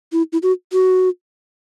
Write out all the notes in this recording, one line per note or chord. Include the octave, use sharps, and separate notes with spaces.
E4
E4
F#4
F#4